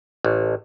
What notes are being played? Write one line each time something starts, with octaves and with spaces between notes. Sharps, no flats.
A1